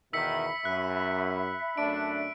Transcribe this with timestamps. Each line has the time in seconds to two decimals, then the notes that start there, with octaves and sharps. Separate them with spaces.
0.13 E2 B2 D#3 E5 B5 E6 B6 C#7
0.65 F#2 F#6
1.77 F#2 A3 D4 D7